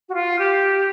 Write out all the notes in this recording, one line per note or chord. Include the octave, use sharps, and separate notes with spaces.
F#4
F4
G4